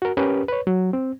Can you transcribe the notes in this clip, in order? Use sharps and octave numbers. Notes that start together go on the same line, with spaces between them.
F#4 A#4
C#4 G4 A#4 B4
B4 C#5
F#3
C4